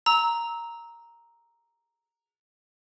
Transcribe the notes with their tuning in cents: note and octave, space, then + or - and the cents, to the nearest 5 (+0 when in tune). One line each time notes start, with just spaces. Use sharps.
A#5 +0 E6 -25